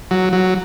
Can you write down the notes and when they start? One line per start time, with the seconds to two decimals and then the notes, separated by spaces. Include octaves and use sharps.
0.11 F#3
0.33 F#3